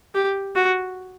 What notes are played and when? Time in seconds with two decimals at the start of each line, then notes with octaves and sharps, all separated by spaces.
0.14 G4
0.55 F#4